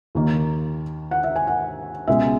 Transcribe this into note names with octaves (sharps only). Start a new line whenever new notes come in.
D#2 D#3 A#3
F#5
E5
G#5
F#5
C#2 B2 G#3 E5